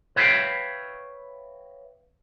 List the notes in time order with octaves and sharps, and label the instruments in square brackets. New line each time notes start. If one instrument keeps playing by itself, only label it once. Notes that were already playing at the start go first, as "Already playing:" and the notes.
[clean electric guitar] B4 C#5 E5 F5 G5